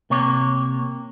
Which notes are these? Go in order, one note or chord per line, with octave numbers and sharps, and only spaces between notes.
C3 A#3 C#5